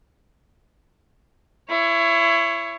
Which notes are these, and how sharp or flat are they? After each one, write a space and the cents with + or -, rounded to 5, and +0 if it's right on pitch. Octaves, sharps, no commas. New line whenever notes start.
E4 +25 C#5 +0